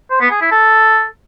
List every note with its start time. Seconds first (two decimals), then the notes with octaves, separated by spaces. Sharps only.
0.10 C5
0.21 B3
0.31 G#4
0.41 E4
0.51 A4